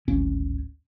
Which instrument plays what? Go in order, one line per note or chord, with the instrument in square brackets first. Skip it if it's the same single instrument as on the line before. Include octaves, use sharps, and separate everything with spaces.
[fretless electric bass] D1 G#1 C#4